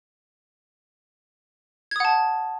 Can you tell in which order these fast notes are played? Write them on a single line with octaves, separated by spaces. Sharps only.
G#6 D#6 F#5 A5